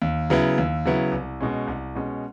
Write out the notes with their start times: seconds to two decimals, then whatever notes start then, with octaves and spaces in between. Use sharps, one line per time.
0.02 D#2
0.30 C#3 F#3 B3 E4
0.58 D#2
0.85 C#3 F#3 B3 E4
1.12 C2
1.41 B2 G#3 C#4
1.67 C2
1.95 B2 G#3 C#4